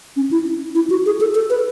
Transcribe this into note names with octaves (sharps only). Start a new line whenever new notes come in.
C#4
E4
E4
F#4
G#4
A4
A4
B4